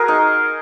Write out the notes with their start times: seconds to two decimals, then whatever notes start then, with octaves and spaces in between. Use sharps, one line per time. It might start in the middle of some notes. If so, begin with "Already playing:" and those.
Already playing: F#4 G#4 A#4
0.08 D#4